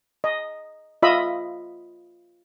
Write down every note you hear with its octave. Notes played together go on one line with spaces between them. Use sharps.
D#5
F4 D#5 E5 B5